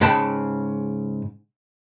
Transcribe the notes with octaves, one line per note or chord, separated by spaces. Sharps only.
G#2 C#3 G#3 G5 A5 B5